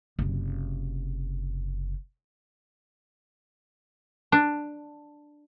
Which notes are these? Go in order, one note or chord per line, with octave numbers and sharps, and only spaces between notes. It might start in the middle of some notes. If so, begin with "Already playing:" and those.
F#1 C3
D4